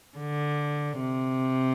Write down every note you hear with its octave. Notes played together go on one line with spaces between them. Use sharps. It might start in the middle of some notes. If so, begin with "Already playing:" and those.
D3
C3